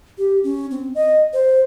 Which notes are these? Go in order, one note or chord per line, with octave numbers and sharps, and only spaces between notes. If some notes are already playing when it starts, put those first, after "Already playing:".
G4
C#4
C4
D#5
C5